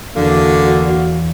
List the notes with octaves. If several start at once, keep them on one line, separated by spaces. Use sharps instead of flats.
E2 D3 A#3 F#4